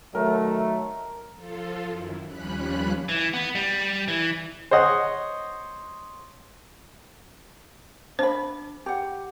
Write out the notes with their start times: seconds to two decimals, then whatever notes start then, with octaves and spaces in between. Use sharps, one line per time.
0.15 D#3 F#3 A3 A#4
1.35 F3 F4 A4
1.90 F#2 D#3 E4
2.25 D#2 F3 G3 C#4 B5 F#6
3.09 E3
3.34 B3
3.55 G3
4.08 E3
4.71 C5 C#5 D#5 F#5
8.19 D4 C5 B5
8.86 G4 F#5